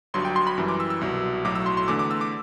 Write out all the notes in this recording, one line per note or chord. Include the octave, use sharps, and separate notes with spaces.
G1 G2 F#3 C6
G5
C6
B5
F#2 E3 G3
D6
E6
E6
C2 B2 F#3
B1 A2 F#3 D6
E6
C6
C6
E2 D3 A3 D6
D6
E6
D6